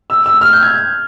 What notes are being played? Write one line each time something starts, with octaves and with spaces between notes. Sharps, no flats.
E6
E6
F6
G6
G#6